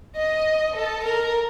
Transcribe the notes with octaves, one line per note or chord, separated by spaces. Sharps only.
D#5
A4
A#4